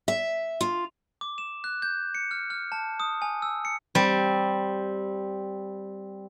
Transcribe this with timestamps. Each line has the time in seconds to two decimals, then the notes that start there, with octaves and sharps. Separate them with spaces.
0.08 E5
0.61 F4
1.21 D6
1.38 E7
1.64 F#6
1.82 G6
2.15 C#7
2.31 F6
2.50 F6
2.72 A5
3.00 D#6
3.22 G#5
3.42 E6
3.65 C#7
3.95 G3 C4